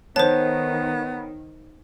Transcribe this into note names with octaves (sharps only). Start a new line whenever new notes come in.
D#3 B3 C5 C#5 A5